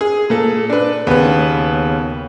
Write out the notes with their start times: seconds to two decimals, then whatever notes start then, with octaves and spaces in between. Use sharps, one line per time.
0.01 G#4
0.30 A#2 A4
0.70 D4 B4
1.07 D#2 C#3 B3 B4